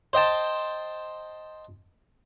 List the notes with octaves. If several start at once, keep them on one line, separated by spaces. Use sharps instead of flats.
C5 D#5 G5 A5